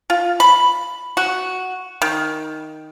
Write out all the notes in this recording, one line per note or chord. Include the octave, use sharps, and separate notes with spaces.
F4
B5
F#4
D#3